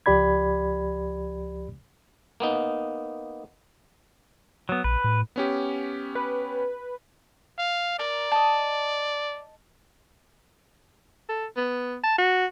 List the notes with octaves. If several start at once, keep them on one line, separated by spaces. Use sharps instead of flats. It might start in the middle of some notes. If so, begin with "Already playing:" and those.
C#2 F3 G4 D5 B5 G#6
A#3 B3 D#4
F#3 B3
A#1 B4
A2
B3 C#4 G4
B4
F5
A#4 D5
D#5 A5
A4
B3
A5
F#4